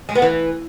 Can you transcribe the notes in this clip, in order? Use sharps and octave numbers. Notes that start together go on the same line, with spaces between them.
G#3
B3
E3